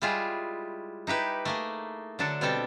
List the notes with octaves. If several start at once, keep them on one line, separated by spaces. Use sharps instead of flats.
G3 G#3 E4 F4 G4 G#4
D#4 E4 G4 B4
A3 A#3 G#4
D3 F#3 D4 A4
B2 G3 C4 A4 G5